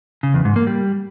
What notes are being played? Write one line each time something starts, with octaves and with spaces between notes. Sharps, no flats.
C#3
E2
G#2
A#3
G3